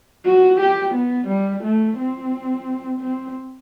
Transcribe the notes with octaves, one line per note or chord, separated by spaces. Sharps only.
F#4
G4
B3
G3
A3
C4
C4